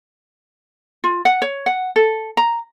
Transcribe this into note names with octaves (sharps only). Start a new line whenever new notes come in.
F4
F#5
C#5
F#5
A4
A#5